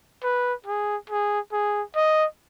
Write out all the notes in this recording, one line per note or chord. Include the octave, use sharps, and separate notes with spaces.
B4
G#4
G#4
G#4
D#5